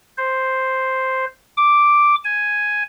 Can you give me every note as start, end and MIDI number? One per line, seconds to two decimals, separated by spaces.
0.18 1.25 72
1.57 2.15 86
2.24 2.83 80